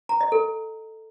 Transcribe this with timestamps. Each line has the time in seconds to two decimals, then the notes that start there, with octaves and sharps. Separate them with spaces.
0.09 A#5
0.21 D#5
0.32 A4